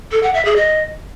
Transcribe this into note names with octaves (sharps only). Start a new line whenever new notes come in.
A4
F#5
E5
G#4
D#5